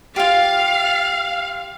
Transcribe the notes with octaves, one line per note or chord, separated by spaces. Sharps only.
F4 G4 F5